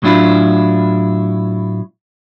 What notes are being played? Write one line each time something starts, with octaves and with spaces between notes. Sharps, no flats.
A2 F#3 D4 E4 F4